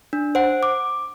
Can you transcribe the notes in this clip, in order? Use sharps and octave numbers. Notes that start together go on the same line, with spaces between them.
D4
C5 F#5
D6